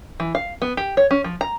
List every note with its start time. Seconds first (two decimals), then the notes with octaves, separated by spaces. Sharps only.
0.20 E3
0.35 F5
0.62 B3
0.77 G4
0.97 C#5
1.11 C#4
1.24 F3
1.41 A#5